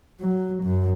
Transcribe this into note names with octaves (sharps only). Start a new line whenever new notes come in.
F#3
F#2